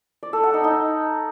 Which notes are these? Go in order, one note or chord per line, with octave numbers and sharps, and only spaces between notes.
D5
A4
F#5
D#4
D#4